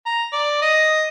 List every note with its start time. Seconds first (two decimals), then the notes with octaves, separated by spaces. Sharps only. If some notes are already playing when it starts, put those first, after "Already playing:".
0.06 A#5
0.32 D5
0.61 D#5